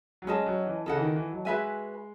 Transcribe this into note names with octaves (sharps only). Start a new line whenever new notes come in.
F#3
G#3 C#4 G#4 D#5 A5
F#3
E3
C#3 A4 D#5 F#5
E3
D#3
E3
F#3
G#3 F#4 B4 E5 G#5